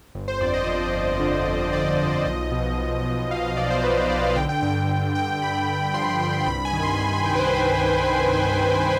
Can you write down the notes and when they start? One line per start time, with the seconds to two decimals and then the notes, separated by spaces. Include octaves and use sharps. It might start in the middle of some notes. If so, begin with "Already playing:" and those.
0.15 G1
0.28 C5
0.41 F2 D5
0.54 D#5
0.67 F3 C5
0.94 F3
1.20 D3
1.46 G1
1.73 G1 D5
1.99 F3
2.25 B1 D#5
2.51 B2
2.78 B1
3.05 B2
3.30 B2 F5
3.45 F5
3.57 B2 D5
3.70 C5
3.84 B1 B4
3.96 C5
4.10 B1 D5
4.23 F5
4.36 D3 G5
4.49 G5
4.62 G2 G5
4.76 G5
4.88 D3
5.15 G2 G5
5.41 G2 B5
5.68 D3
5.94 F3 C6
6.21 G2
6.46 C2 B5
6.65 G#5
6.73 D#3
6.83 C6
6.99 C2 B5
7.13 B5
7.26 C2 G5
7.35 B4
7.39 C5